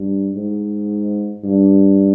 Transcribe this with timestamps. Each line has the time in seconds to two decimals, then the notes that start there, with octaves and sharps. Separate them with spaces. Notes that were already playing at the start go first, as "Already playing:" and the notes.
Already playing: G2
0.34 G#2
1.44 G2